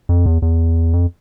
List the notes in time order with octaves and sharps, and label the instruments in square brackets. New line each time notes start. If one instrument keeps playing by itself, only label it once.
[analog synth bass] F2
E2
E2
F2